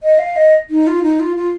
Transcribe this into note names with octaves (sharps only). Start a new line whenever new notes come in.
D#5
F5
D#5
D#4
F4
D#4
F4
F4